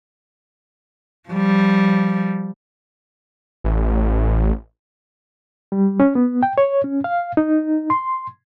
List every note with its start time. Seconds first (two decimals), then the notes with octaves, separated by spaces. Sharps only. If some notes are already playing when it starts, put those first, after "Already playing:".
1.29 F3 G3
3.64 A1
5.72 G3
6.00 C#4
6.15 B3
6.43 G5
6.58 C#5
6.84 C#4
7.04 F5
7.37 D#4
7.90 C6